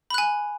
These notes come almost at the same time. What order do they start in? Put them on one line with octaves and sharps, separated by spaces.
B5 F#6 G#5